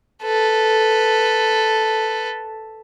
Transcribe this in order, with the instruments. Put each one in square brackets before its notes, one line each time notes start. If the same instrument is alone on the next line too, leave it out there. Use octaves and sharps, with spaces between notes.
[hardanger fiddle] A4 B4